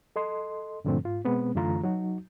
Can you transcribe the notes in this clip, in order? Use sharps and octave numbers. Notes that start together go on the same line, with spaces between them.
A4 D#5 C6
G2 A#2 D3 F3 A3 C4
G#2 F4
B2 G#3 B3 C4
F#2 D3 E3 A3 F4 A#5
F#3 D#4 F#4